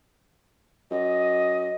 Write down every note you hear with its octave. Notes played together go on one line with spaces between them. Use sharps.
F#2 D#5